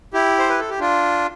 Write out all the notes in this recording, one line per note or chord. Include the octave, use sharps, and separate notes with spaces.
E4 G4
C5
B4
A4
G4
D4 F4